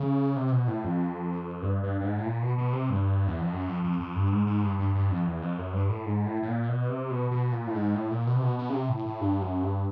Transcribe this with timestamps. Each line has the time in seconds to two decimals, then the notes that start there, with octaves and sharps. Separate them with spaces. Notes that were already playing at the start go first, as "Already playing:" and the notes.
Already playing: C#3
0.36 C3
0.52 B2
0.68 A2
0.84 F2
1.62 G2
1.83 G2
2.00 G2
2.05 G#2
2.19 A2
2.26 A#2
2.42 B2
2.58 B2
2.73 C3
2.90 G2
3.27 E2
3.41 F2
3.53 F#2
3.68 F2
3.84 F2
4.00 F2
4.16 G2
4.32 G#2
4.47 G#2
4.64 G2
4.79 G2
4.95 G2
5.11 F2
5.26 E2
5.42 F2
5.58 F#2
5.73 G2
5.89 A2
6.06 G#2
6.26 A2
6.43 A2
6.48 A#2
6.69 B2
6.89 C3
7.11 B2
7.31 B2
7.52 A#2
7.67 A2
7.74 G#2
7.95 A2
8.11 A#2
8.27 B2
8.35 C3
8.43 B2
8.59 B2
8.69 C#3
8.74 C3
8.89 A2
9.06 A2
9.21 G2
9.42 F#2
9.63 G2